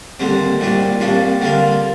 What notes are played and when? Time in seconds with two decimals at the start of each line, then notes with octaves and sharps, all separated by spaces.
0.20 D#2 D3 G3 C4
0.60 C2 A#2 G3 D4
1.00 C2 A#2 G3 D4
1.41 D3 G3 A#3 F4